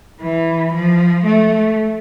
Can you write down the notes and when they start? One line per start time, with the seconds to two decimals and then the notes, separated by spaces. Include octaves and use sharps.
0.21 E3
0.73 F3
1.25 A3